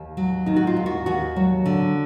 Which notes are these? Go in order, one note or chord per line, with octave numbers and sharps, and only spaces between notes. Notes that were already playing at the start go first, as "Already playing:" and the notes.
Already playing: D#2
F#3
D#3 D#4
F#4
F4
D#2
F#4
D#2 F#4
F#3
D3